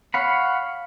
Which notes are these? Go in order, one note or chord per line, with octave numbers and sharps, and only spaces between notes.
C#5 F5 F#5 B5